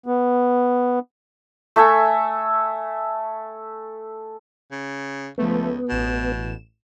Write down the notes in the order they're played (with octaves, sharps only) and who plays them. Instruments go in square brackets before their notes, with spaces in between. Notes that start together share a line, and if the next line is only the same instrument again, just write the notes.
[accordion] B3
[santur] A3 A4 E5 G#5
[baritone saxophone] C#3
[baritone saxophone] C#2 [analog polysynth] F3 A3 [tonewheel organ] B3
[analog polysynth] A1 E7 [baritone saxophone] B2